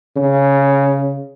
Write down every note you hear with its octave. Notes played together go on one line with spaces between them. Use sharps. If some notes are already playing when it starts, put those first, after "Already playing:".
C#3